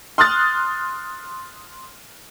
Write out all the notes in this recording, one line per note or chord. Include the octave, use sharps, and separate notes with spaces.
C6 D#6 F6 F#6 A6